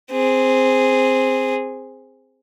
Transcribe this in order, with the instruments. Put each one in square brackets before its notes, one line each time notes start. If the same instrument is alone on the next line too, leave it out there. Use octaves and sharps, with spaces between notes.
[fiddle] C4 G#4